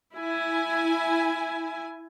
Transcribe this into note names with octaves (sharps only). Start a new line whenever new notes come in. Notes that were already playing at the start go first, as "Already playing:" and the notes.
E4 G#5